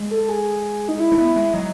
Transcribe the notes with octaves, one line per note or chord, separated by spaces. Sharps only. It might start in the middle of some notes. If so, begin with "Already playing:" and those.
Already playing: G#3
A4
G#4
D#4
E4
A3
B3 E4
G#3 E4
F#3 D#4